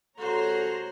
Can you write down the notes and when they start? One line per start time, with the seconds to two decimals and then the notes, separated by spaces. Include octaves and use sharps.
0.18 C3 G#3 F#4 A4 C5 C#5 A#5 C6